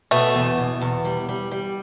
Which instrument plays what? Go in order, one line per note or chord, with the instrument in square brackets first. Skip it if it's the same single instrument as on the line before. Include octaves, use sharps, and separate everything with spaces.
[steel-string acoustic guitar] B2 [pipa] A3 B3
[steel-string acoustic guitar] E2
B2
E2
G3
G3
G3